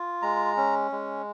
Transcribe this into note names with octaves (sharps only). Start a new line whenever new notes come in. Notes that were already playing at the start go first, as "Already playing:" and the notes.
Already playing: F4
G#3 A#5
C#4
G#3